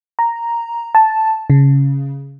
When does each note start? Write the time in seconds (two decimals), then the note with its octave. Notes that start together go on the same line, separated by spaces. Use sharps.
0.19 A#5
0.95 A5
1.50 C#3